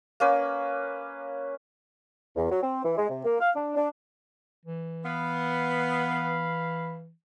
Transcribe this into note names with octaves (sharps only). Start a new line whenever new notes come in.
A#3 C#4 B4
E2
F#3
C4
E3
G#3
C3
A#3
F5
D4
D4
E3
B3 F5 B5